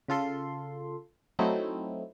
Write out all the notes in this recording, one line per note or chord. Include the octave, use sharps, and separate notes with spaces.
C#3 F4 A4 C6
F#3 A3 C4 D#4 E4